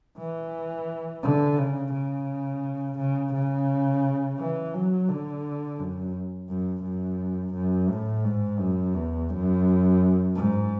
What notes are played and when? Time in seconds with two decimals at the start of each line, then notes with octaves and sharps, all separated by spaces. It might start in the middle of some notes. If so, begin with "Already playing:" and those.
0.18 E3
1.23 D3
1.58 C#3
1.93 C#3
2.99 C#3
3.34 C#3
4.39 E3
4.74 F#3
5.09 D3
5.79 F#2
6.49 F#2
6.84 F#2
7.54 F#2
7.90 A2
8.24 G#2
8.60 F#2
8.95 E2
9.30 F#2
10.35 G#2